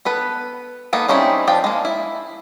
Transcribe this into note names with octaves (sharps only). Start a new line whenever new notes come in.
B3 A4 B4
A#3 B3 D#4 A4
G3 C4 C#4 D#4 E4
F3 D4 F4 G5
G#3 A#3
E4